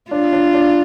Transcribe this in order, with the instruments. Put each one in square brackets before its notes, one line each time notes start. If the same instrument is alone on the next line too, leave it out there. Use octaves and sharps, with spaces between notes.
[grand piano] D4 [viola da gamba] F4
[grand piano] D4
D4